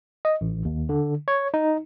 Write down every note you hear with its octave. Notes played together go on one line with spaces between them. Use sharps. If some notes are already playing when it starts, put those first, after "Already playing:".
D#5
A1
D#2
D3
C#5
D#4